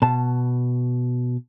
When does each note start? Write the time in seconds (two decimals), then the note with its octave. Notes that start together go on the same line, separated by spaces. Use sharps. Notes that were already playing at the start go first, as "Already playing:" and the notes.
0.02 B2 A5